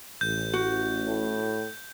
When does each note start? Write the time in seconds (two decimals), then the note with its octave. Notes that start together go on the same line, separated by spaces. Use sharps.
0.21 A1 G6
0.53 F#4
1.05 A2